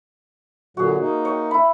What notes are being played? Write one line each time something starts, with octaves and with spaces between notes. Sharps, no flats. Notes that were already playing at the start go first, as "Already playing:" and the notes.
A#2 D3 F#3 F#4 G#4
A#3 D#4
C#5 G5
E4 B5